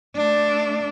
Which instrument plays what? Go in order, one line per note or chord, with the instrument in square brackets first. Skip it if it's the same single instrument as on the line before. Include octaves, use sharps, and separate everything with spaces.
[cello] A3 D4